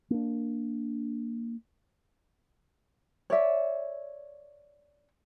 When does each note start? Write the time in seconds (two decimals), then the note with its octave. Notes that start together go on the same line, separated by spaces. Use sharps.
0.10 A#3 D4
3.30 C#5 D5 E5